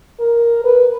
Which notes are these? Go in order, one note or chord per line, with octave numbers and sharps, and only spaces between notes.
A#4
B4